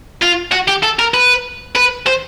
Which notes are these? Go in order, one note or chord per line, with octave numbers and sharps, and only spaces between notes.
F4
F#4
G4
A4
A#4
B4
B4
C5